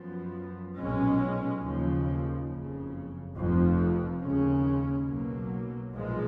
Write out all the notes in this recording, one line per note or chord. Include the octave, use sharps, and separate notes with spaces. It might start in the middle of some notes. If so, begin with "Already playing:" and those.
Already playing: F#2 F3 B3
B1 A#2 G#3 C#4
D#2 C#3 F3
F#1 F2 C#3
F1 F2 F3
D#2 C#3 G#3 C#4
B1 B2 F#3 A#3
B1 A#2 F3 G#3